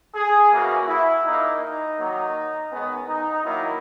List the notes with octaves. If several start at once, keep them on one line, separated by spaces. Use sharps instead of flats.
G#4
C#3 E3 A#3 F#4
E4
A#2 A#3 D#4
D#4
D#3 F#3 A#3
D#3 G#3 B3 C#4
D#4
D#3 F#3 A#3 E4